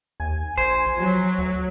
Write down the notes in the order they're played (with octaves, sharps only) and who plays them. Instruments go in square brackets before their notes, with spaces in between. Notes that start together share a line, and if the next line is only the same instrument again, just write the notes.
[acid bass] D#2 [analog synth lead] G#5
[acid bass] A#1 [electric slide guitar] C5
[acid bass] F3 [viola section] F#3
[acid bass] D2